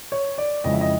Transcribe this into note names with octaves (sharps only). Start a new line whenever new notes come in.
C#5
D5
F2 C#3 E3 G#3 D#5
E5
D#5